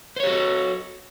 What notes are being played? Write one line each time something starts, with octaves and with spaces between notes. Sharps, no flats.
F#4 G4 A4 C5 C#5